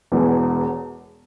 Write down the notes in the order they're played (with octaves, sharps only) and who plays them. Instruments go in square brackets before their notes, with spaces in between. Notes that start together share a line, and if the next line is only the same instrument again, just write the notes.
[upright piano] E1 E2 B2 G#3